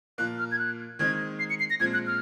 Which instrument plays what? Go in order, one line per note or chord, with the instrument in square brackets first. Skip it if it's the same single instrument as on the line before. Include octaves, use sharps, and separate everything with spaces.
[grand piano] A#2 F3 A#3 [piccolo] F#6
[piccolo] F6
G#6
F#6
[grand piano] D#3 G#3 C4 D#4 [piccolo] G#6
[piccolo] C7
C#7
C7
A#6
[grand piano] A#2 F3 G#3 C4 [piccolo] G#6
[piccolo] F#6
F6